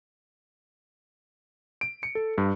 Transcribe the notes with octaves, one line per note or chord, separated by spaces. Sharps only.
D7
C#7
A4
G2